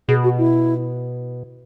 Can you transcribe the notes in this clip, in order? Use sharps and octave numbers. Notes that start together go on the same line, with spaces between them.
B2 G#4
F#4
E4